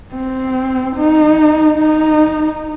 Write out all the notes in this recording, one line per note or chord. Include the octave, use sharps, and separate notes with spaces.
C4
D#4
D#4